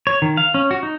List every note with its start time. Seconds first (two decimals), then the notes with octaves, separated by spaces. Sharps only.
0.07 C#5
0.22 D#3
0.37 F5
0.54 C#4
0.71 F#4
0.83 D#4